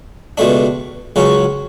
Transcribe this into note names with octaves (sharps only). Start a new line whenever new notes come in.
C#2 B2 A3 D4
C#2 C#3 F#3 C#4